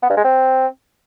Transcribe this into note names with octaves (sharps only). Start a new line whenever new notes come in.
B3
G2
G#3
C4